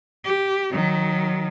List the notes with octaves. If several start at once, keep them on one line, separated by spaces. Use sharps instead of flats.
G4
D#3 F#3